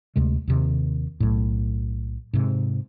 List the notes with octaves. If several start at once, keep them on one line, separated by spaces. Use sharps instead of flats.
D2 C3 G#3
D#2 C3 D#3
B1 A2
G#2 C3